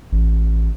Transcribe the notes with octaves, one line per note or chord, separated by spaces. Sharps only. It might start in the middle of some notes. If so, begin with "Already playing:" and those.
A1